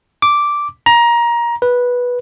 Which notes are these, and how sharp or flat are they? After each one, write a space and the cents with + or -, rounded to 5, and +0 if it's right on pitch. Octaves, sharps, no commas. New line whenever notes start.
D6 -5
A#5 +20
B4 -10